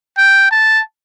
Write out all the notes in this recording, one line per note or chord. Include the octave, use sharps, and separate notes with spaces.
G5
A5